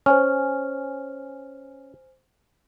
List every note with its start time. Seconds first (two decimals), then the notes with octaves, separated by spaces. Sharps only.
0.06 C#4 C5 G#5 F6